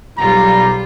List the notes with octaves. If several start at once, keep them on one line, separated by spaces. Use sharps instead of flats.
B1 G3 F4 A#5